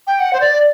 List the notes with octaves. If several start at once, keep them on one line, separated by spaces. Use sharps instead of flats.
G5
F#5
C5
D5